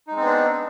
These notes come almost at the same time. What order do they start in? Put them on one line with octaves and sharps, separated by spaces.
D#4 G#3 C4 B3 D4